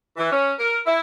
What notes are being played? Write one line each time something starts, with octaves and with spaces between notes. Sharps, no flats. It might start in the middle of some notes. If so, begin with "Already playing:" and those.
E3
C#4
A#4
E4